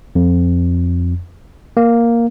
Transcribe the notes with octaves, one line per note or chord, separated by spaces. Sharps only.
F2
A#3